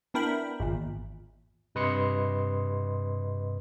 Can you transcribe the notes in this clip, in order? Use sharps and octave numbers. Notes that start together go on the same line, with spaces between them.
B3 D4 E4 A#4 G5 B5
G#1 E2 A#2
G2 C3 B4 D#5 C6 C#7